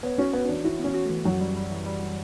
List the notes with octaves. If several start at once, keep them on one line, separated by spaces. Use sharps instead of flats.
B3 C#5
C#4 F#4
B3 C#5
C#4
E3 D4
E4 F#4
B3 C#4
F#4
A3
E3
F#2 F#3
G3
G3
E3
G3